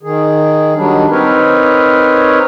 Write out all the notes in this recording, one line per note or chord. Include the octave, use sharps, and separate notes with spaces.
D#3 G#4
D#3 F#3 G3 D4
C4 D#4 A#4 B4 C#5